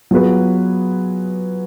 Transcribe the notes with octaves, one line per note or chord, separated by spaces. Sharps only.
F#3 B3 F4 G#4 B4